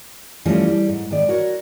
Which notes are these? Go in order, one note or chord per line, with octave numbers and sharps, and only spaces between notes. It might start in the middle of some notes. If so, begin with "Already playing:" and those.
E3 F3 G3 A3 C#4
G3
G#2
G#2 D#3 D5
F#4 A#4 C#5